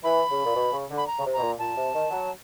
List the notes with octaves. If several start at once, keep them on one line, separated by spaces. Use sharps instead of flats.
E3 B5
C#3
A#2
B2
C#3
D3
B5
A#5
C#3
C3
B2 A#5
A#2
A#2 A5
C3
D#3
F#3